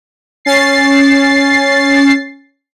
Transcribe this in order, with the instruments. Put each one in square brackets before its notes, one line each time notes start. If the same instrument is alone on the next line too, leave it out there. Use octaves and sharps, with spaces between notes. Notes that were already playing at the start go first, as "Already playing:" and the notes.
[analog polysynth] C#4 A6 C7